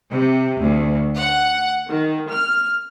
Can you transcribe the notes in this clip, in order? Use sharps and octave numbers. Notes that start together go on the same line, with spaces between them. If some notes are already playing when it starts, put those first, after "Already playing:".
C3
D2
F#5
D#3
F6